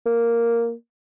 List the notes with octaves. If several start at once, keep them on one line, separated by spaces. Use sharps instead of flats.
A#3